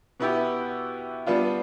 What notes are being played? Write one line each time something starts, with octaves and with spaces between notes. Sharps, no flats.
B2 B3 E4 G4
G3 B3 D4 F4